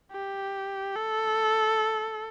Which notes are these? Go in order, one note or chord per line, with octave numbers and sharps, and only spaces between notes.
G4
A4